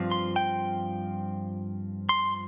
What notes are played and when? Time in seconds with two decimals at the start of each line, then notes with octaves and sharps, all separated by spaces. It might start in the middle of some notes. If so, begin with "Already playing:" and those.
Already playing: G2 F3 C4 F4
0.12 C6
0.36 G5
2.09 C6